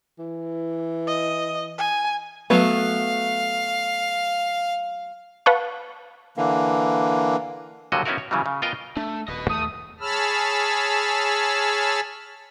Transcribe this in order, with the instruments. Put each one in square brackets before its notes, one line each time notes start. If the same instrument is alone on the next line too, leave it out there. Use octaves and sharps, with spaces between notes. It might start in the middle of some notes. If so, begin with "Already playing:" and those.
[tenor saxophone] E3
[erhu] D#5
G#5
[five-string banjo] F#3 A3 B3 [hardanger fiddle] F5
[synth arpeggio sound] B4 F5 F#5 A5 C#6
[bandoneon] D3 E3 A#3
[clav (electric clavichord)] D#2 D3 F#3 G3 F#4 D#5
B3 C#4 D#4 E4 F#4 A#4
C#5
C#3 E3 F#3 G3
C#3
B3 F4 A#4 D#5 G5
[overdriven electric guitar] A3 [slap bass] D4
[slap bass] D#1 [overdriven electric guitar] B4 D#5
[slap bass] D#2 [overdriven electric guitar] A3 [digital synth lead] D#6
[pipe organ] G#4 C#5 A5 B5 E6 F6